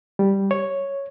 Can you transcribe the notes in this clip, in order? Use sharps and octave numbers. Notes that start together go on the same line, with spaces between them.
G3
C#5